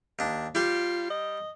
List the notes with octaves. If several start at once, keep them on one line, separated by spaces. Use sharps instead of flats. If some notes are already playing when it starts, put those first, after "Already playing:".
D#2 D4
G3 F4 G4
D#5